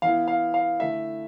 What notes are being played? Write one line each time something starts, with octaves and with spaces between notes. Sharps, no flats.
E3 B3 E4 F5
F5
F5
D3 A3 E4 E5